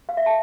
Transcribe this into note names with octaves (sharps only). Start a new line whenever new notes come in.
F5
E5
A5